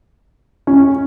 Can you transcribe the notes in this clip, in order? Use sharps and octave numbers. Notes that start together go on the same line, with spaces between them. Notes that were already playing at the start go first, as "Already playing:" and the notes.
C#4